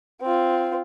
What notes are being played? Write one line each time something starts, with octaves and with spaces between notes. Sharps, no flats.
C4 F4